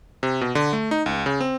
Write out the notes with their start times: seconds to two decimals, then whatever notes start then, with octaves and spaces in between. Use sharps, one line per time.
0.23 C3
0.41 B2
0.55 D3
0.73 A3
0.91 D#4
1.06 C#2
1.26 C#3
1.41 C4